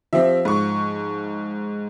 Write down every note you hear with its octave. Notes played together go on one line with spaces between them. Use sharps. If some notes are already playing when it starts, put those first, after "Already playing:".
F3 C4 G4 E5
G#2 C#6